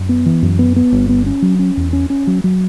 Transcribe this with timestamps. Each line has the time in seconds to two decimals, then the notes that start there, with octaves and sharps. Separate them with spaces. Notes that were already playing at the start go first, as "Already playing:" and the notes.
Already playing: F#2
0.09 B3
0.26 E3
0.42 F#2
0.59 B3
0.76 B3
0.92 G1
1.09 B3
1.26 C#4
1.42 F#3
1.59 C#4
1.77 E2
1.93 C#4
2.10 C#4
2.27 F#3
2.44 F#3